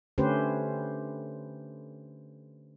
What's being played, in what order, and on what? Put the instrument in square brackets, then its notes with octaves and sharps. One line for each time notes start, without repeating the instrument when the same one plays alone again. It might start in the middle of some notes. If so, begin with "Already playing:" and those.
[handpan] D3 A3 C#4 G4 B4 C5